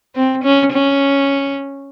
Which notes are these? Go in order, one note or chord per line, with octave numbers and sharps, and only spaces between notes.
C4
C#4
C#4